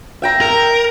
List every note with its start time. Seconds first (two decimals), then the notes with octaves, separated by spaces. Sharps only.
0.22 E5 G5 A#5
0.41 A#4